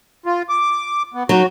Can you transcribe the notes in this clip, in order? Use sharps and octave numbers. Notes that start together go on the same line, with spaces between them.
F4
D6
B3
F#3 D#4 F#4